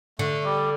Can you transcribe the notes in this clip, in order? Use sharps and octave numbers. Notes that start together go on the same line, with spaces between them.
D3 A3
G3